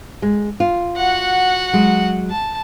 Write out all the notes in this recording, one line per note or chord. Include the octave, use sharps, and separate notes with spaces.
G#3
F4
F#4 F#5
F#3 G#3
A5